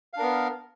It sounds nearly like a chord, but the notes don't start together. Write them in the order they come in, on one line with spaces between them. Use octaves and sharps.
F5 D4 A#4 B3